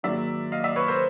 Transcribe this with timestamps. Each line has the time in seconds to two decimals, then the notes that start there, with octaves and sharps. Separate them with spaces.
0.03 G#2 D#3 F#3 A#3 D5 E5
0.52 D#5 F5
0.64 D5 E5
0.76 B4 C#5
0.88 A#4 C5